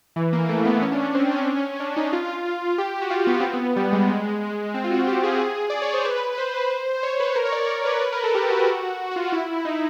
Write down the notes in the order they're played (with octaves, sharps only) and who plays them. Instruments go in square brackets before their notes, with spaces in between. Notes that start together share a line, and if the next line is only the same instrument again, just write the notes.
[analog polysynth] E3
A#3
A3
B3
C#4
D4
C#4
C4
C#4
D4
D#4
F4
G4
F#4
F4
B3
C4
B3
G3
G#3
C4
F4
F#4
G4
G#4
D5
C#5
C5
B4
C5
C5
C#5
B4
A#4
C#5
D5
D5
C#5
B4
B4
A#4
A4
G4
F#4
F#4
F4
E4
D#4